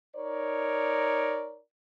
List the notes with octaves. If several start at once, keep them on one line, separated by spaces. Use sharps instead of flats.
D#4 A#4 C#5 D5